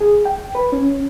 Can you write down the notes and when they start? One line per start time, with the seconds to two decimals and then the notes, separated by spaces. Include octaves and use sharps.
0.01 G#4
0.25 G5
0.55 B4
0.72 C#4